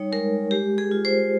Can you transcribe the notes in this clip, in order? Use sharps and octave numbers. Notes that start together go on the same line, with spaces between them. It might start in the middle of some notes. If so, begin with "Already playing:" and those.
Already playing: G3 D#4 C#5
G#3 A#4
G#3 G4
G#4
F4
C5